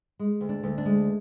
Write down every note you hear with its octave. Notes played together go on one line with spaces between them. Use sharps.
G#3
D2
D4
D2
D4
G#3